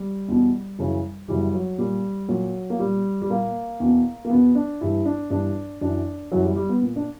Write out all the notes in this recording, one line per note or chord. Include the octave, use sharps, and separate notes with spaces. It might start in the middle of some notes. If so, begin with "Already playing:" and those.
Already playing: G3
E2 B2
F#2 C#3 E3
F#2 C#3 E3 G3
F#3
A#2 G3
A#2 F#3
A#3
A#2 G3
G3
A#2 A#3
E2 B2
A#3
E2 B2 B3
D4
G2 E3 E4
D4
G2 E3 D4
F#2 E3 D4
F#2 E3 F#3
G3
G3
B3
A#2
D4